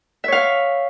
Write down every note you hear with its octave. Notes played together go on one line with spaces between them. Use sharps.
C#5 E5 F5